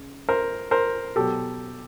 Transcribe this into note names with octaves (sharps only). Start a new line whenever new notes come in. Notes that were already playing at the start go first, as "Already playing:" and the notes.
Already playing: C#3
A#4 C5
A#4 C5
B2 F#3 G4 A4